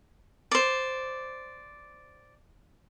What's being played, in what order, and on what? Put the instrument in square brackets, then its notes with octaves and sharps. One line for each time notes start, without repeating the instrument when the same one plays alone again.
[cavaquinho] C5 D5